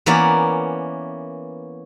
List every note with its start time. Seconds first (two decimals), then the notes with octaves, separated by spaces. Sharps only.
0.06 E3 A#3 B3 C#4 D5